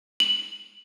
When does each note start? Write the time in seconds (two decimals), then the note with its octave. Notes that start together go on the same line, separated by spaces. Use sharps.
0.20 F#7